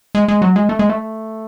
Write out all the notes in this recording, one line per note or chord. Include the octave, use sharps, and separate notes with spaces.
G#3
G#3
F#3
G#3
A3
G#3
A3